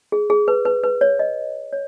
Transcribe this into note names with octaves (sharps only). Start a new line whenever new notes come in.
G#4
G#4
B4
B4
B4
C#5
D#5
C#5